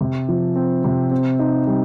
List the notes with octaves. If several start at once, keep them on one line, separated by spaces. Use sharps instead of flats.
C3
F3
C4
C3
C4
D#4
G3